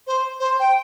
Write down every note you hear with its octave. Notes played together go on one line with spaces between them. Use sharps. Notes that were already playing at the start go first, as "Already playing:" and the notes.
C5
C5
G5